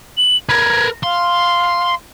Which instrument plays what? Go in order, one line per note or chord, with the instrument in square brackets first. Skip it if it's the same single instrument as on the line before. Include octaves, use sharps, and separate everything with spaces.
[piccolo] F#7
[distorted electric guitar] A#4 B4 [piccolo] G#6
[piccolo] F5 [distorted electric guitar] C6